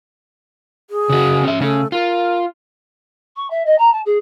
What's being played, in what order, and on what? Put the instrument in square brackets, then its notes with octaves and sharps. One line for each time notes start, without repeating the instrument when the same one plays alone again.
[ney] G#4
[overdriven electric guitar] C#3 F#4
C#4 E5
[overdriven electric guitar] C#3 C#4 [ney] A3
[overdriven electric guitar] F4 [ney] A#4
[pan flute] C#6
E5
D#5
A#5
A5
G#4